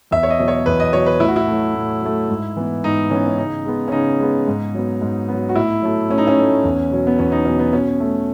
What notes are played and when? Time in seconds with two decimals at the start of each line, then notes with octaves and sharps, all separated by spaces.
0.11 E2 E5
0.23 C#5
0.30 D#5
0.39 B2 F#3
0.48 C#5
0.66 E2 B4
0.80 D#5
0.93 B2 F#3 C#5
1.06 B4
1.20 A2 E4
1.28 F#4
1.36 E4
1.47 F#3 A3
1.75 A2
2.02 F#3 A3
2.29 G#2
2.56 E3 B3
2.84 G#2 D#4
3.10 E3 B3 C#4
3.27 C#4
3.38 C#3 D#4
3.65 G#3 B3
3.88 C#4
3.92 C#3 D#4
4.19 G#3 B3
4.47 G#2
4.74 F#3 B3
5.01 G#2
5.29 F#3 B3
5.49 F#4
5.55 A2 E4
5.82 F#3 A3
6.10 A2 C#4
6.18 D#4
6.27 C#4
6.37 F#3 A3
6.64 E2
6.91 B2 F#3
7.07 B3
7.19 E2 C#4
7.32 D#4
7.45 B2 F#3 C#4
7.59 B3
7.73 B2 C#4
8.00 A3